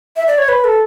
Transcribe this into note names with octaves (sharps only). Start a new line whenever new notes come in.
E5
D5
C#5
B4
A4